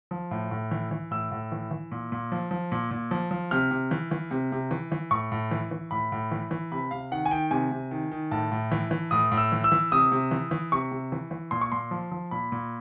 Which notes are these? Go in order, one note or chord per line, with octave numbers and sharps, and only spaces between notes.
F3
A2
A2
E3
E3
A2 E6
A2
E3
E3
A#2
A#2
F3
F3
A#2
A#2
F3
F3
C3 F6
C3
E3
E3
C3
C3
E3
E3
A2 C#6
A2
E3
E3
A2 B5
A2
E3
E3
C3 B5
C3 F5
D#3 F#5
G#5
D#3 G5
C3 G#5
C3
D#3
D#3
A2 A5
A2
E3
E3
A2 D#6
A2
E6
E3
E6
E3
C3 D#6
C3
E3
E3
C3 C#6
C3
E3
E3
A#2 C6
C#6
A#2 C6
F3
F3
A#2 B5
A#2